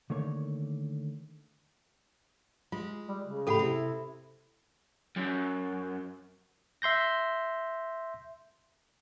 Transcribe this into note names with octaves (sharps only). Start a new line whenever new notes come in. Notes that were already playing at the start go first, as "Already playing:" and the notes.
D3 D#3 A3 A#3 C#5
G#3 F4
G3
C#3
A2 G4 A4 F#5 B5
C3 E4
F#2
E5 C6 G6 A#6